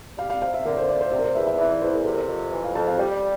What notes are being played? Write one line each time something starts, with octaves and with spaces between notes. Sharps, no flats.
G3 F5
F5
C3 F5
E5
D3 A#4
C5
D2 D5
C5
C3 D5
A#4
C5
E2 E5
E5
E3 D5
D5
E2 C5
A#4
C3 A4
A#4
F2
E3
F5
F2 A5
F5
G3 G5